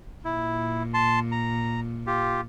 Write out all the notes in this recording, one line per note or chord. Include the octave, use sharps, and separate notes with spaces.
A#2 E4
A5 C6
A#5
F4 G4